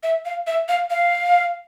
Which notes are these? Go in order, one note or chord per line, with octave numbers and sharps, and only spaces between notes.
E5
F5
E5
F5
F5